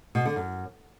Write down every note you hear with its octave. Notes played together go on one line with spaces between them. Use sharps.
B2
D3
F#2